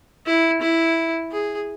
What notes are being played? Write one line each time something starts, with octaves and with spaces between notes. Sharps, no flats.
E4
E4
G#4